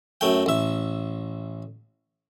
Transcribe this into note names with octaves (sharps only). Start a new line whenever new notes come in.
F#2 A3 G5
A1 E5